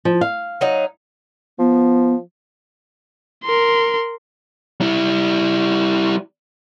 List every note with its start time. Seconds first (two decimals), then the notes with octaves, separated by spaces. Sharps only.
0.05 F3
0.21 F5
0.61 F#3 D#4
1.59 F3 B3
3.44 A#4 C6
4.81 G3 E4